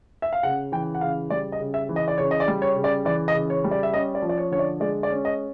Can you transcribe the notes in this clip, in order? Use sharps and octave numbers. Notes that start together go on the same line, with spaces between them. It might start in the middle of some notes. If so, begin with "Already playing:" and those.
E5
F5
C#3 F#5
E3 G5
F#5
C#3 F5
G3 D5
D#5
C#3
E5
E3
D#5
D5
C#3 C#5
D#5
D5
G3
C#5
C#3
D5
E3 D5
D#5
C#3
C#5
G3
D5
E5
C#4 D#5
D5
F3
D5
C#5
D3 C#5
D5
G#3 D5
D5
C#4
D#5